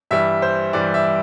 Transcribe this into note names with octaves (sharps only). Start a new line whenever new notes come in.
G2 E3 G3 E5
C5
G2 E3 G3 D5
E5